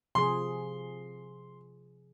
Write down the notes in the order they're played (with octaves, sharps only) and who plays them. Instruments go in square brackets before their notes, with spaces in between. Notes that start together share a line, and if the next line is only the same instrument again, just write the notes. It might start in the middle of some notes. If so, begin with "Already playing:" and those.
[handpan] C3 F3 G#4 [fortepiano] C6